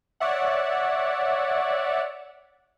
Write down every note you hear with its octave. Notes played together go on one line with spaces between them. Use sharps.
C#5 D5 E5 F#5